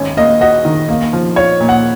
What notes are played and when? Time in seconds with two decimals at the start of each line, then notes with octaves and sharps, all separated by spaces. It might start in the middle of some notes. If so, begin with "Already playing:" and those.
Already playing: G#1 C#4
0.17 A#3 D#5
0.41 F#4 D#5
0.65 D#3
0.89 A#3
1.13 F3
1.36 F4 C#5
1.60 A#2
1.69 F#5